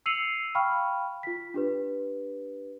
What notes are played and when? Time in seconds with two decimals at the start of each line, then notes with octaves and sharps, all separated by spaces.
0.06 E6 C7 C#7 D#7 F7 F#7
0.55 F5 G5 B5 C#6 F6
1.23 F4 B6
1.54 D4 G4 B4